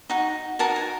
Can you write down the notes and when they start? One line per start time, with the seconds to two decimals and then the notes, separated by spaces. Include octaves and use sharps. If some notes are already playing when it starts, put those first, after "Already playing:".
0.10 D#4 F#4
0.59 D#4 F#4 A#4 A5
0.76 G#5